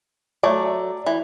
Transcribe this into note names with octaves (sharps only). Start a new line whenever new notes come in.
F#3 A3 D5
E3